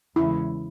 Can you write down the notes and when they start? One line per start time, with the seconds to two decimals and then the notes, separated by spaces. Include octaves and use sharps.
0.16 E2 C#3 E3 G#3 E4